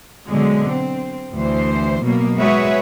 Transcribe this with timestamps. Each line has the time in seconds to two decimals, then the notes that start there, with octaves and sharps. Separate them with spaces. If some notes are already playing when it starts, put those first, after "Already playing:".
0.27 B2 D3 F#3 G#3
0.70 C4
1.32 D2 E3 C5
2.04 B2 F#3 A#3
2.38 G#3 F#4 G#4 B4 C#5 E5